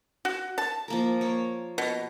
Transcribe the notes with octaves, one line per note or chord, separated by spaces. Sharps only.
F#4
A5
F3 A#3 A#4
A#3 C#5
B2